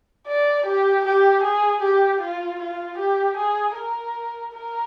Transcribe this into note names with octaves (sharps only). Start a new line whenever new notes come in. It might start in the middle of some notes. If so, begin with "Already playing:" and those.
D5
G4
G4
G#4
G4
F4
F4
G4
G#4
A#4
A#4